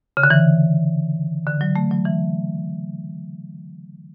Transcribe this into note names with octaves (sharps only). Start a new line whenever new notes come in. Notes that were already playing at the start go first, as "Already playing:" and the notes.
C#3
D3
E3
D3
F#3
A3
F#3
E3